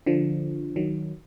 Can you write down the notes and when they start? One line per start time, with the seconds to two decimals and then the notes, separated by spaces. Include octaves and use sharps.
0.06 D3 F3
0.76 D#3 F#3